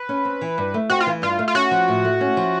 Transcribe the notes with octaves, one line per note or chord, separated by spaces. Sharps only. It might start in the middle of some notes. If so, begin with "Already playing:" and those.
Already playing: B4
C#4
C4
E3
G2
A3
C4 F#4
F4
E3
G2 F4
A3
F4
C#4 F#4
F3
A2
A3
C#4
F3